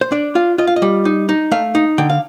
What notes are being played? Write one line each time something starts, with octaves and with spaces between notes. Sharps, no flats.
C5
D4 D5
F4 F5
F4 D#5
F5
D#5
G3
D#4
D#4
A3 F5
D#4
D3 G5
F5